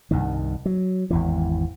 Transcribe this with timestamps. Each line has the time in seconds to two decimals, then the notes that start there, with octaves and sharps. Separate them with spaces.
0.11 C2 G2 D#3
0.66 F#3
1.10 G#1 E2 E3